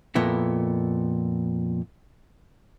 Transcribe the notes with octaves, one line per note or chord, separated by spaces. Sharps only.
F2 A#2 B3 E4